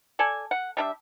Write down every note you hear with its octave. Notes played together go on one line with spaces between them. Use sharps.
A4 D5 G#5
F#5
G3 D4 E5